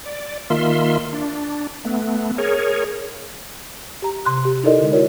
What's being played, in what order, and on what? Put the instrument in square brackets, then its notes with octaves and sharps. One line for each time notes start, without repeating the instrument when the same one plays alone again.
[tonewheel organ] D5
D#3 A#3 F4 E5 C6
D4
A3 B3
G#4 A#4 C#5
[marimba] G4 A#5
C3 C6 F#6
G4
D#4 E4 A4 A#4 D5 D#5
D3 G#3
E4 F#4 A#4 C#5 D5